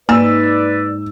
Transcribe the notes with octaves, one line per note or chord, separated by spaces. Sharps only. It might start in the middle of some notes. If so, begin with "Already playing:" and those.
G#2 A#3 B4 D5 E6